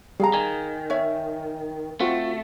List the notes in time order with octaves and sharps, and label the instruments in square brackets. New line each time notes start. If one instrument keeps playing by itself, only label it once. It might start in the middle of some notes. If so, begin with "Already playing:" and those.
[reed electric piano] G3 [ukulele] G#4 F5 A#5
[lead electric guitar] D#3 [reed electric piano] G#5
[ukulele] C#5 E5
[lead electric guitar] A3 [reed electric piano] C4 F4 F#4